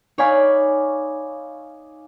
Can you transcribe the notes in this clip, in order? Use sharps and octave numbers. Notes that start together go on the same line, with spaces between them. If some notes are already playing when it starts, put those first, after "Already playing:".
D#4 C#5 D5 F5 G#5 B5